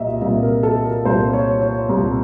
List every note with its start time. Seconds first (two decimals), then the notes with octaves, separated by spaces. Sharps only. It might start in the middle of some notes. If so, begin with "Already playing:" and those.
Already playing: C2 A#2 D#5 E5
0.21 C2 A#2 E5
0.43 A#4
0.63 A4
0.84 A#4
1.05 C2 A#2 C5
1.33 C#5
1.61 C#5
1.89 C2 A#2